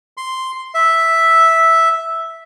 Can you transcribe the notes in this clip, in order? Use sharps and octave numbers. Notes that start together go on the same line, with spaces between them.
C6
E5